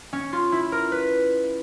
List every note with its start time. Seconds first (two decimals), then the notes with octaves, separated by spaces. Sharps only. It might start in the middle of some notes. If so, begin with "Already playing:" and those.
0.13 C#4
0.33 F4
0.52 E4
0.72 A#4
0.92 B4